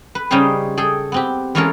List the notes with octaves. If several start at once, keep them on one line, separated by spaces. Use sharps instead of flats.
B4
C#3 G3 C#4 D#4 G#4 C5
G#4 A4 G5
B3 C4 G4
E3 G#3 C#4 F4 A4 A#4